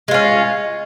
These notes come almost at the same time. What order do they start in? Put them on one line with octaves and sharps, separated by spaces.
G#3 F4 C#4